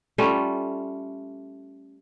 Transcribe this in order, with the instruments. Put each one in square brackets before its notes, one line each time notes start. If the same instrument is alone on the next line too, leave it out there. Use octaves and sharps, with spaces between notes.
[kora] G3 A3 C#4 F4